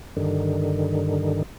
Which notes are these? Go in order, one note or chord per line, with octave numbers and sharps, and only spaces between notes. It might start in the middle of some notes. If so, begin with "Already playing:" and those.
G2 D3 D#3